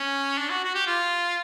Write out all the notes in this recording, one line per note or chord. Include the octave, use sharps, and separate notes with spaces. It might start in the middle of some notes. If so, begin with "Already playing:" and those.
Already playing: C#4
D4
F#4
F#4
G4
F4